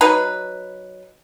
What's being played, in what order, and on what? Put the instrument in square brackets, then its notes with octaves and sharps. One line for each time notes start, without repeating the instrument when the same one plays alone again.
[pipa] F#3 D#4 B4